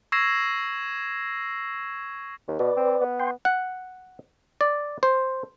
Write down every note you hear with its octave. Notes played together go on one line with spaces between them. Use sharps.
C#6 E6 G#6 A#6 C7 E7
D#2
B2 B4 D5
C4
B3
G5 C6
F#5
D5
C5